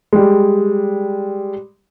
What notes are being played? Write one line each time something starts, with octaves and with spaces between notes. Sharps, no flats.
G3 G#3